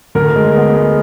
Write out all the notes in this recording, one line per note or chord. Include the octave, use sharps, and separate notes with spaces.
D2 A#4
G#3
B3
G#3